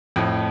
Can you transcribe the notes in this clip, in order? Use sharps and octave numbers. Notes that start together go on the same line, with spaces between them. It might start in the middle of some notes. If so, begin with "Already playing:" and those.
F2 A2